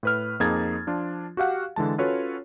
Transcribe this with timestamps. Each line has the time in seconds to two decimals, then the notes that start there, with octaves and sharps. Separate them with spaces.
0.03 A2 B4 F6
0.40 F2 A#3 D#4 G#4 G#6 A6
0.87 F3 D4 F4
1.37 F#4 G4 F5 F#5
1.76 D3 E3 G#3 A5
1.98 C#4 F4 F#4 A4 B4 C#5